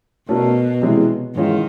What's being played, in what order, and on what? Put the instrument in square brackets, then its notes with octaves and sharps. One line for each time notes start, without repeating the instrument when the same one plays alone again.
[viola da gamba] B2 [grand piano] A3 C#4 F#4 A#4 D5
[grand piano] C3 E3 G#3 C#4 E4
[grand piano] G#2 E3 G#3 C#4 F4 [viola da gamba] D#3